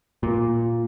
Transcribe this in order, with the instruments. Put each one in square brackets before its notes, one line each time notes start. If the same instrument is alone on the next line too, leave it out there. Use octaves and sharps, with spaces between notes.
[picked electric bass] A#2